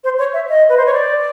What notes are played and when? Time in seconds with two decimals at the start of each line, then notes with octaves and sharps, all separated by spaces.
0.04 C5
0.19 C#5
0.34 E5
0.49 D#5
0.69 B4
0.77 C5
0.86 C#5
0.94 D5